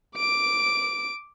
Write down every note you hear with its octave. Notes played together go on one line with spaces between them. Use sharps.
D6 D7